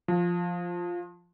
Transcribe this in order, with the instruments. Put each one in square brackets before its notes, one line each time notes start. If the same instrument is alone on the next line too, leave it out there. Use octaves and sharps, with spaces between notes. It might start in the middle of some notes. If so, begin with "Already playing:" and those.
[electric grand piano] F3